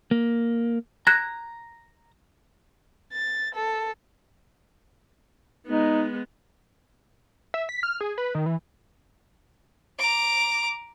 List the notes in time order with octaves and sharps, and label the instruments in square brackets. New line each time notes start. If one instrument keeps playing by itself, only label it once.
[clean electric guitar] A#3
[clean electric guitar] A#5 [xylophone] F#6 G#6 A#6
[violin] A6
A4
[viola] G#3 B3 [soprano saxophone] D#4
[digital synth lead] E5
B6
F6
G#4
B4
D#3
E3
[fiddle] A#5 D6